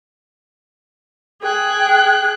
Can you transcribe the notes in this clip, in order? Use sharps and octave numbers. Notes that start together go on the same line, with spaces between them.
G#4 G5 F#6